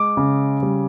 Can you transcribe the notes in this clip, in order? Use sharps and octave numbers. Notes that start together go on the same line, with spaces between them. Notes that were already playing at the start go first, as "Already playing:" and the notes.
Already playing: G#3 D6
C#3
G3